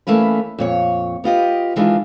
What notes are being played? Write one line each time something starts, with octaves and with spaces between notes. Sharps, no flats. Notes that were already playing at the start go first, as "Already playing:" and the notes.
E3 A3 A#3 C#4 B4
F2 A#2 C#5
B3 F4 G4 D#5
D#3 E3 G#3 D4 F4